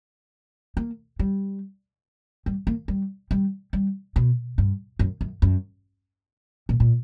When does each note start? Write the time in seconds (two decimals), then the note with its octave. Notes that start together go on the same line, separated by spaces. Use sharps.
0.77 A#3
1.19 G3
2.46 G3
2.67 A#3
2.88 G3
3.31 G3
3.73 G3
4.16 B2
4.58 G2
4.99 F#2
5.21 F#2
5.42 F#2
6.69 A#2
6.80 A#2